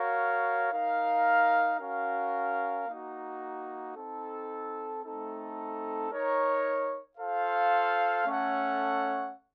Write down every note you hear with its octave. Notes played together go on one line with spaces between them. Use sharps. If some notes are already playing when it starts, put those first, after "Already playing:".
Already playing: F#4 A#4 C#5 F5
D#4 A#4 F5
C#4 F#4 A#4 F5
A#3 D#4 F#4
C4 D#4 A4
A3 C4 D#4 A4
D#4 A#4 C#5
F4 A4 C5 F5
A3 C#4 A4 C#5 F#5